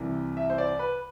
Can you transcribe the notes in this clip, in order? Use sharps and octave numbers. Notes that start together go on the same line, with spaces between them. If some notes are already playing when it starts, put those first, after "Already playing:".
Already playing: C2 C3 E3
E5
C5
D5
B4